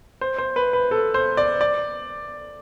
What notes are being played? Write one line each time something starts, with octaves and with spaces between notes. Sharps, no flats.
C5
C5
B4
B4
A4
C5
D5
D5